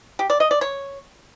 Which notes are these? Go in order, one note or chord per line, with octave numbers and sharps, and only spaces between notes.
G4
D5
D#5
D5
C#5